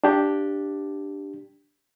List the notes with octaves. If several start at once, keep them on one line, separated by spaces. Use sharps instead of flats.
D4 G4